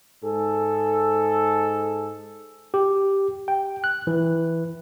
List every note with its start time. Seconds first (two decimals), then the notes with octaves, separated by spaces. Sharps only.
0.23 G#2 G#4 A4
2.74 G4
3.48 G5
3.84 F#6
4.07 E3